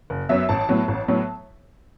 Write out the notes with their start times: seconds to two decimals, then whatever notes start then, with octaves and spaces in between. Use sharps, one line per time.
0.10 F#1
0.29 F#2 F#3 B3 E5
0.49 A1 A5
0.69 A2 F#3 B3
0.88 A1
1.08 A2 F#3 B3